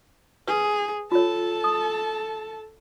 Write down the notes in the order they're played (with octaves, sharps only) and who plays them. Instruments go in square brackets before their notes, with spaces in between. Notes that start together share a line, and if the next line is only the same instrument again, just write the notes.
[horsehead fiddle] G#4 [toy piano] B4
[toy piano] F4 C#5 [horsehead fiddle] A4 A5
[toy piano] D#6